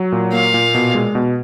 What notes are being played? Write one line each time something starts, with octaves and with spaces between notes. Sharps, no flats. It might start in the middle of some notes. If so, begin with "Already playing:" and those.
Already playing: F#3
A#2
A#3 F5
A#2
B2
G#3
B2